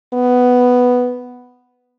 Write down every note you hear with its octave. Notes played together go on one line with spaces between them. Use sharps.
B3